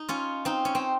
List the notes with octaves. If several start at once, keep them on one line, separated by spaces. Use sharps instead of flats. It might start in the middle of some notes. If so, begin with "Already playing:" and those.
Already playing: D#4
C#4 F4
C4 D#4
C#4
C4